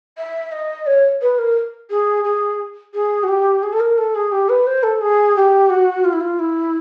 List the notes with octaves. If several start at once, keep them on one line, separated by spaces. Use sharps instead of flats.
E5
D#5
C#5
B4
A#4
G#4
G#4
G#4
F#4
G4
G#4
A4
A#4
A4
G#4
G4
B4
C5
A4
G#4
G4
F#4
F4
E4
F4
E4